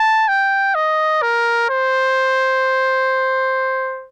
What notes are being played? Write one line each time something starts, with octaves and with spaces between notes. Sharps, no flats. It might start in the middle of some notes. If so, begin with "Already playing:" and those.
Already playing: A5
G5
D#5
A#4
C5